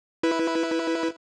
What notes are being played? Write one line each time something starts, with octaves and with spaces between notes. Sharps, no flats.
E4 B4